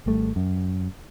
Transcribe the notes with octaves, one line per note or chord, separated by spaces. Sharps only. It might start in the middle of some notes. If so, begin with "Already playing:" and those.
G#1 G3 A3
F#2